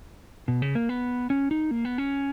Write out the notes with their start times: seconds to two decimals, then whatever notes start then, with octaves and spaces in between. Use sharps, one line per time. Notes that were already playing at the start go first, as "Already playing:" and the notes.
0.48 B2
0.62 C#3
0.75 A#3
0.89 B3
1.30 C#4
1.51 D#4
1.71 A#3
1.85 B3
1.98 C#4